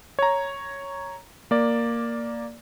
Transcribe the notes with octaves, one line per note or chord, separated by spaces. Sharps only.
C#5 A#5
A#3 D5